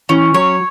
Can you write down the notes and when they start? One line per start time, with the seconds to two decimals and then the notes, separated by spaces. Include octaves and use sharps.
0.09 E3 C#4
0.34 F#3 C#5